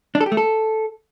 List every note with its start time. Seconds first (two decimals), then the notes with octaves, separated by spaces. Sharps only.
0.15 D4
0.21 A4
0.26 G4
0.32 A3
0.37 A4